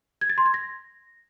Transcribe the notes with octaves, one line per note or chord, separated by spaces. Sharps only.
G#6
A6
C6
G#6
A#6